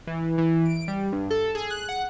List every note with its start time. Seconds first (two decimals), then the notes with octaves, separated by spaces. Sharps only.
0.07 E3
0.38 E3
0.66 D7
0.88 G3
1.12 G2
1.31 A4
1.55 G#4
1.70 F#6
1.89 F#5